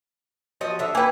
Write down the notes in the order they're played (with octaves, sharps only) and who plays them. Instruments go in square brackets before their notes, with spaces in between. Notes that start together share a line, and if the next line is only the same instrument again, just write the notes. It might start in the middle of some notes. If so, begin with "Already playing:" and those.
[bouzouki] F3 F#4 D#5
D3 E5
[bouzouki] A#3 B4 [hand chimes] G5 G#5